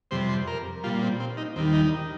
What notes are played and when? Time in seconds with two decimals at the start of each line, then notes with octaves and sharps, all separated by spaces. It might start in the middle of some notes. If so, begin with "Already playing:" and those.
0.11 F2 C3 G3 C5
0.29 C5
0.47 A#4
0.84 A#2 G3 F4
1.02 C4
1.20 C4
1.37 D#4
1.56 D#2 D#3 G3 C4
1.73 D#4